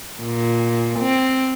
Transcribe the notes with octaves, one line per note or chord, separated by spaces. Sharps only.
A#2
C4